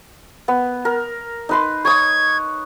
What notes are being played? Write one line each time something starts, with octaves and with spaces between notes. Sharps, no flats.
B3
A#4
D#4 B4 C6
C#5 D#6 G#6